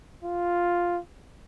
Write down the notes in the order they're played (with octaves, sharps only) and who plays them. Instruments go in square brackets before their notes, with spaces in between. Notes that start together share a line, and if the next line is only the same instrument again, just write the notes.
[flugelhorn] F4